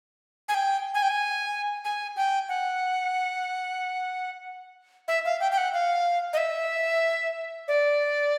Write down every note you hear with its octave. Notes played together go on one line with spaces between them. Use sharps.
G#5
G5
G#5
G5
G#5
G#5
G5
F#5
E5
F5
G5
G5
F#5
F5
D#5
E5
D5